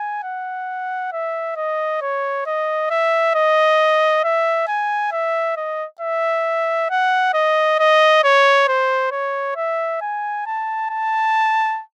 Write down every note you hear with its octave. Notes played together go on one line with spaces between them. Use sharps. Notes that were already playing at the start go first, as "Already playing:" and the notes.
Already playing: G#5
F#5
E5
D#5
C#5
D#5
E5
D#5
E5
G#5
E5
D#5
E5
F#5
D#5
D#5
C#5
C5
C#5
E5
G#5
A5
A5